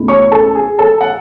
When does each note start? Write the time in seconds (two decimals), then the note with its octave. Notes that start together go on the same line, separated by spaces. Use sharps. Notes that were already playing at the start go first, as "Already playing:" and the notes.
Already playing: C#2 B2 A3 E4
0.08 C#5 C#6
0.32 A4 A5
0.55 G#4 G#5
0.79 A4 A5
1.01 F#5